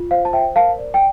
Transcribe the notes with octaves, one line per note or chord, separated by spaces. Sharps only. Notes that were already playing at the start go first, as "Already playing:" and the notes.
Already playing: F4
C5 F5
A5
C5 E5 G5
A#4 F5 A5
D5
G5